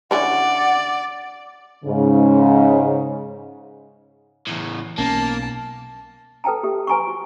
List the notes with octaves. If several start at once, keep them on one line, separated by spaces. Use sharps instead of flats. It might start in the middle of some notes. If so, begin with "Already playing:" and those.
D3 C#4 E4 D5 F#5
G#2 C#3
E2 A2
B1 A#3 C#4 A5
A4 B4 G5 A5 A#5
G4 A4 E5
B4 G#5 A#5 C6 C#6
F#4